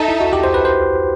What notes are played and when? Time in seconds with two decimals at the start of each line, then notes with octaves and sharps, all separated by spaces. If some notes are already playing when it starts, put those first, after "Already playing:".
Already playing: D#4 A4 E5
0.08 E4
0.21 F#4
0.33 G4
0.44 C5
0.54 B4
0.65 C5